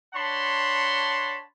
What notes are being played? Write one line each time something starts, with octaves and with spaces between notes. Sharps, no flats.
D4 C#5 F#5 A5 B5 C6